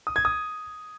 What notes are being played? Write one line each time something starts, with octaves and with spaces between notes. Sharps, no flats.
D#6
G#6
D#6